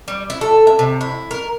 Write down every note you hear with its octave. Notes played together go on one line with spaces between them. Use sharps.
G3
E4
A4
E5
C3
E4
A#4